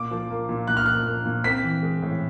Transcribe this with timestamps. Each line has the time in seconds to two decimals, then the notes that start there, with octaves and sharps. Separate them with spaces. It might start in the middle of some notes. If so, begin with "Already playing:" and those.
Already playing: A#2 D6
0.11 F3
0.30 A#3
0.49 A#2
0.68 A#2 F#6
0.77 F6
0.86 F3 F#6
1.07 A#3
1.26 A#2
1.44 C4 B6
1.63 E3
1.83 G#3
2.02 A2